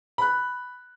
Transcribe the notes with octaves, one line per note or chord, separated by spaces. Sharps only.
B5 F#6